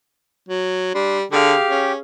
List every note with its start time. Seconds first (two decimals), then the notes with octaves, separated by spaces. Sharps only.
0.48 F#3
0.94 G3 D4 C6
1.32 D3 G4 G#4 F5
1.69 C#4